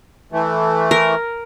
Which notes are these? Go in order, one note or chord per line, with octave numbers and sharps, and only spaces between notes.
E3 A3
A#4